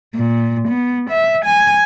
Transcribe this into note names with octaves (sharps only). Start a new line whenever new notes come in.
A#2
B3
E5
G#5